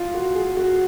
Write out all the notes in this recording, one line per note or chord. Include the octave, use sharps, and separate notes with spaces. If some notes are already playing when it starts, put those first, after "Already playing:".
Already playing: F4
F#4
G#4
F#4